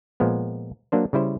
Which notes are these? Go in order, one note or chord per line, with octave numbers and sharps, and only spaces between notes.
A#2 F3 G#3 B3
F#3 A#3 D4 C5
C#3 G3 E4 C5